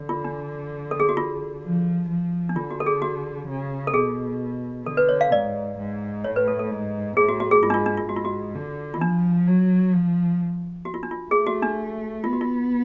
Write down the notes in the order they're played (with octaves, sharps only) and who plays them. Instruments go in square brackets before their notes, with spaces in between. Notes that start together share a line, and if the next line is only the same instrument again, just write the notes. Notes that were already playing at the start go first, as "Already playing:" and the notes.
Already playing: [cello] D3
[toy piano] F4
D4
A4
G#4
F#4
F4
[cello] F3
F3
[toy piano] D4
[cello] D3 [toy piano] F4
[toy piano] F#4
A4
G#4
F#4
[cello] C#3
[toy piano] A4
[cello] B2 [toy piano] G#4
[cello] D3 [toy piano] A4
[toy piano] B4
C#5
F5
[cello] G#2 [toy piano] D5
[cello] G#2
[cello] A2 [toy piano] C#5
[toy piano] B4
A4
A4
[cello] G#2
[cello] A2 [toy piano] G#4
[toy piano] F#4
F#4
G#4
[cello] G#2 [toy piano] F4
[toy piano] D4
F4
D4
F4
[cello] G#2 [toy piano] F#4
[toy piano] F4
F#4
[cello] D3
[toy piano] F4
[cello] F3 [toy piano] D4
[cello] F#3
F3
[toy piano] F#4
F4
D4
F4
[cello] A3 [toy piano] G#4
[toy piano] F#4
D4
[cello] B3 [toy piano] F4
[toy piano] F#4
F4